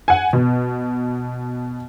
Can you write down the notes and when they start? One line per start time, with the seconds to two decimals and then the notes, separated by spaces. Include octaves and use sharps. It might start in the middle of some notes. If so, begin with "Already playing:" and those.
0.08 F#5 G#5
0.33 B2